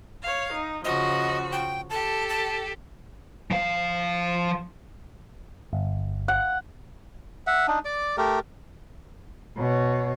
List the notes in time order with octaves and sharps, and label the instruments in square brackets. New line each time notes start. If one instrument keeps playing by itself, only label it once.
[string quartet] C#5 F5
D#4
[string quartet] C#3 F3 F#4 [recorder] D#5
[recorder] G5
[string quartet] G4 A4 [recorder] A5
[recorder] A5
[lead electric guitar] F3 F5
[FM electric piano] G1
[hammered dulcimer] F#5
[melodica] E5 F#5
D4 D#4
D5 D6
A3 G4 A#4
[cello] B2 C#5